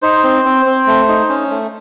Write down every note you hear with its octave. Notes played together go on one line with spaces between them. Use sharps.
D#4 C5
C4
C4
C4
A3
D#4
C#4
A3